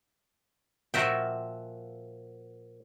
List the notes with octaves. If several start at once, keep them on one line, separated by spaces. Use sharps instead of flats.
A#2 F3 F#4 E5 G5 A#5